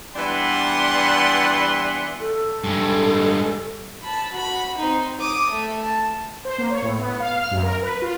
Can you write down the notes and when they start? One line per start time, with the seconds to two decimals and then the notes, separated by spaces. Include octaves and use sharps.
0.16 E3 G3 B3 D4 F#5 C6
2.20 A4
2.64 G2 G#3
4.03 A5 B5
4.32 F#4 B5
4.77 C4 D#4
5.20 D6 D#6
5.50 A3
5.83 A5
6.45 C5
6.58 A#3
6.70 C#5
6.82 A2
6.99 B3
7.20 F5
7.37 F6
7.51 F#2
7.63 A#4
7.82 B4
8.02 F4